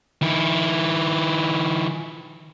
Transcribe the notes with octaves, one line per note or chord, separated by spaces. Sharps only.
D#3 E4